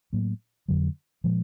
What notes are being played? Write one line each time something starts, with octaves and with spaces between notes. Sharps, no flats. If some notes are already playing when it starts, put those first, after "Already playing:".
A2 F#3 A#3
F2 D3 F#3
A#2 F3 G#3